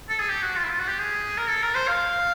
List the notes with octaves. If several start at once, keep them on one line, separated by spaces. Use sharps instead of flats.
A4
G#4
G4
F#4
F4
E4
F4
F#4
G4
G#4
A#4
A4
A#4
C5
F5